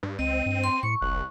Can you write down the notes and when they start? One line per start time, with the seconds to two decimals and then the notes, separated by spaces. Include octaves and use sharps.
0.03 G2
0.19 C#2 C4 D#5 D#7
0.46 G2
0.64 C6
0.83 A2 C#6 C#7
1.01 F1 C2 F#6